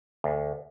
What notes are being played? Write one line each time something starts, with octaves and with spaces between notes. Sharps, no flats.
D2